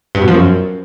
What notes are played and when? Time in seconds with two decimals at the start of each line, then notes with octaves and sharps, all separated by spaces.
0.15 G2
0.21 B2
0.28 F3
0.34 F#2